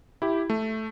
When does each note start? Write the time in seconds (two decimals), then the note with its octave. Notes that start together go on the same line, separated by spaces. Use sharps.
0.22 E4 G4
0.50 A3